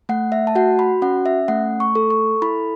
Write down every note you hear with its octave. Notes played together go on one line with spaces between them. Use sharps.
A3 F#5
E5
A5
F#4 F#5
B5
C#4 F#5
E5
A3 F#5
C#6
A4
C#6
E4 B5